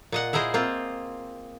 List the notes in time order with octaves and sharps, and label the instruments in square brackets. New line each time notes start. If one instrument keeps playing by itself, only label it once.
[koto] A#2 D#5 F#5
E4 G#4 A#4 C5 D#5
A#3 C4 F4